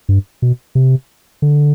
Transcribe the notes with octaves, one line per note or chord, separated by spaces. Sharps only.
G2
B2
C3
D3